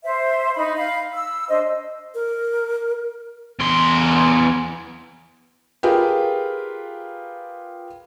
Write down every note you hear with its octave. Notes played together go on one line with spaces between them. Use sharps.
C5 E5
D#4 B5
F5 B5
E6
D4 C5 D#5
A#4
E2 C6
F4 G4 G#4 A#4 B4 G5